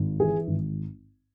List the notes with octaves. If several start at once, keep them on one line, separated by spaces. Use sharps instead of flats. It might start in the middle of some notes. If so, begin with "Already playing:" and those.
Already playing: G#1
E3 G#4
G#1